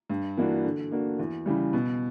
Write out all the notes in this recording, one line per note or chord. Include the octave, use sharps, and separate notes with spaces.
G2
E3 A#3 D4 F#4
D3
A#3 D4 F#4
E2
C#3 E3 G3
B2